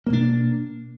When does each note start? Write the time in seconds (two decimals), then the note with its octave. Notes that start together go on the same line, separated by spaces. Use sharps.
0.07 A#3
0.10 B2
0.13 D4